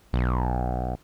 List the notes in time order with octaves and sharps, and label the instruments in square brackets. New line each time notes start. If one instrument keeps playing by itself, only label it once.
[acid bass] B1